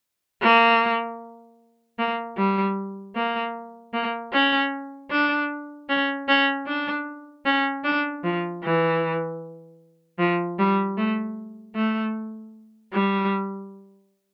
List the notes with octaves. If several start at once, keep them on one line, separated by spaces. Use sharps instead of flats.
A#3
A#3
G3
A#3
A#3
C#4
D4
C#4
C#4
D4
C#4
D4
F3
E3
F3
G3
A3
A3
G3